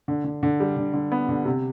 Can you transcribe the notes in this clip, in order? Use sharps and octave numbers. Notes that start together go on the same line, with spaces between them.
D3
D3
D3
G3
D3
D3
B3
D3
C3